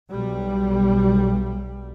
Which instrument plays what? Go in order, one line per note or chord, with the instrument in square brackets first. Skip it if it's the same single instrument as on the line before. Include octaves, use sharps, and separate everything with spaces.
[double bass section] B1 G3